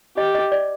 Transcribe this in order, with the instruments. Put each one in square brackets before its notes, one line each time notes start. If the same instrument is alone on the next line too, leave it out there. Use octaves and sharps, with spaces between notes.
[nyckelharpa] G4 [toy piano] D#5
[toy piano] D#5
D5